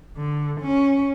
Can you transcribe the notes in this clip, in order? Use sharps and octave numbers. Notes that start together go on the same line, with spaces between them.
D3
C#4